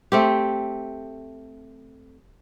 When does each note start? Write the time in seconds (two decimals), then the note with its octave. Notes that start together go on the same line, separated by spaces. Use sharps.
0.12 A3 C4 G4